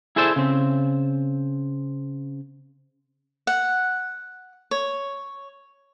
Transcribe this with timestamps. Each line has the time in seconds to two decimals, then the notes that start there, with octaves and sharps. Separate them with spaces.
0.16 E4 G#4 A4 C5 D5 E5
0.36 C#3 C4
3.47 F#5
4.71 C#5